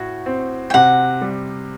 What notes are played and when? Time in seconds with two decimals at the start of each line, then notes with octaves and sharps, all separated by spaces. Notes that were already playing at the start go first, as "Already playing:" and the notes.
Already playing: A2 F#4
0.26 C4
0.70 G5
0.74 C3 F#5
1.21 G3